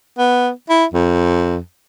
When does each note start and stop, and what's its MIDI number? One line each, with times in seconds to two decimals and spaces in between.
0.18 0.50 59
0.70 0.85 64
0.94 1.57 41